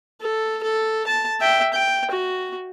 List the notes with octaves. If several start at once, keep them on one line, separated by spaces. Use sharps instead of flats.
A4
A4
A5
E5 G5
G5
F#4